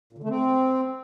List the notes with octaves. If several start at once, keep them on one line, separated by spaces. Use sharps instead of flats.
A#2
D3
A3
C4